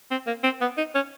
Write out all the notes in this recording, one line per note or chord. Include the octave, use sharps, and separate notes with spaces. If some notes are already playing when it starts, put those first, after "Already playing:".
C4
A#3
C4
B3
D#4
C#4